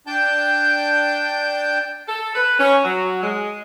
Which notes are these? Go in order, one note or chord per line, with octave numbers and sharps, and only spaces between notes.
D4 G5 A5 G6
A4
B4
C#4
F#3
G#3